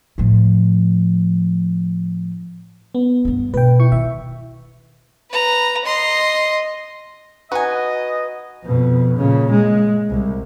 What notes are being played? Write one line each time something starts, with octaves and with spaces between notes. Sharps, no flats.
A2 F3
B3
G2 D3
B2 B4 G5
E4 C#6
D#3 E5
B4 A#5
D#5 C6
D#4 F#4 B4 D#5 F#5 G#5
F2 B2
A#2 C#3
G#3
C2